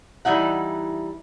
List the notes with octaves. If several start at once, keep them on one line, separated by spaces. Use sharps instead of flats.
E3 G3 D#4 E4 F#5